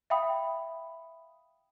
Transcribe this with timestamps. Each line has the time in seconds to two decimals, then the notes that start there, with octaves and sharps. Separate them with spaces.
0.10 E5 F5 G5 B5 D#6